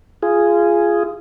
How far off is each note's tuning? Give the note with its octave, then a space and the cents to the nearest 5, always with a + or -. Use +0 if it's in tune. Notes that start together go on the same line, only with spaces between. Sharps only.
F4 -20 G#4 +0